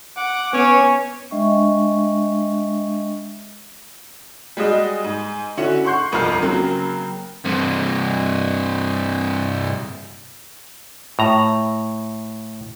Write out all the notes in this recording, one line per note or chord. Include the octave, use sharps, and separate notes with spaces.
F#5 D6
B3 C#4 C#5
G#3 D4 D#5 E5 G5 C#6
G3 G#3 F#4 D#5 E7
G#2
D3 C#4 E4 F#4 F#5
F#5 C6 C#6 G6 C7
G1 C2 F2 A#5 F6 C7
C#3 F#3 A#3 C4
G2 C3
A2 A#5